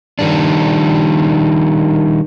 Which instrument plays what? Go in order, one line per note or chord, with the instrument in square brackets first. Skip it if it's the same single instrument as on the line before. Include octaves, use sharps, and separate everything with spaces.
[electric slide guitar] D#3 G3 D4